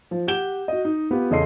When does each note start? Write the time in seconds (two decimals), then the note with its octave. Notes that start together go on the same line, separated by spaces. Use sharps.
0.11 F3
0.27 G4 F#5 G6 E7 G7
0.68 F#4 D#5
0.85 D#4
1.11 B3 F4 G4 B4
1.30 E2 C#3 A4 D#5 C6 C7